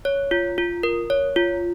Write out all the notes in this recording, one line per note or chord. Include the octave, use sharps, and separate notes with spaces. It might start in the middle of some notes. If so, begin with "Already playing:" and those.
C#5
F4
F4
A#4
C#5
F4